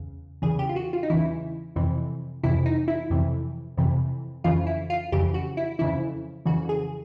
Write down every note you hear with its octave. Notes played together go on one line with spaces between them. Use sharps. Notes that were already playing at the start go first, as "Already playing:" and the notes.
Already playing: E2 C#3
E2 C#3 E3 G#4
G4
F4
F#4
F4
D#4
E2 C#3 E3 E4
F2 C3 E3
F2 C3 E3 E4
D#4
E4
F2 C3 E3
F2 C3 E3
F2 C#3 E3 F4
E4
F4
F2 C#3 E3 G4
F#4
E4
F2 C#3 E3 E4
F2 C#3 E3 F#4
G#4